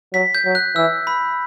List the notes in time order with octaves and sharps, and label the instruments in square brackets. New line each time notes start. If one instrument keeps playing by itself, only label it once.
[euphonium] F#3 [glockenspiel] B6
[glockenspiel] G6
[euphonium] F#3
[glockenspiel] F#6
[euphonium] E3 [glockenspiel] E6
[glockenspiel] B5